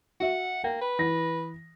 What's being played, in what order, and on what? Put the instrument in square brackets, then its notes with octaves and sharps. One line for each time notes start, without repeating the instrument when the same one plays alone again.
[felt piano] F#4 E5 [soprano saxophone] F#5
[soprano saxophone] A#3 [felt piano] G5
[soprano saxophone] B4
[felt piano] E3 A#6